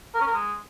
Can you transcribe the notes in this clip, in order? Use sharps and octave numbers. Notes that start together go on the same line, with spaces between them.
A#4
C#4
A#4
G#3